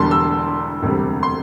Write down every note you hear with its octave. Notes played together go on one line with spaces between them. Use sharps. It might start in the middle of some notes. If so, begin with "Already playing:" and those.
Already playing: E1 E2 D3 G3 A5 C6
E6
E1 D2 C3 G3
C6